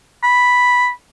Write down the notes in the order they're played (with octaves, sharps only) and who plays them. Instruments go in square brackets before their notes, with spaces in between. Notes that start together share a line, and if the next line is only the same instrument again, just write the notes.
[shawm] B5